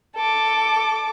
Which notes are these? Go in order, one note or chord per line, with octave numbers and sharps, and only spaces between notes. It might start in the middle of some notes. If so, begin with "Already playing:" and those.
A4 D6